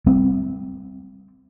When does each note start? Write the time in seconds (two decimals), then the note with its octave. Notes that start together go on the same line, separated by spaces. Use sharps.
0.06 G3 C4